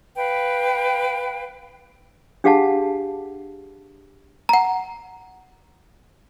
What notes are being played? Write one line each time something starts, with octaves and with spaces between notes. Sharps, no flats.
B4 F5 G5
D4 G4 G#4 F5 F#5 A5
F#5 A#5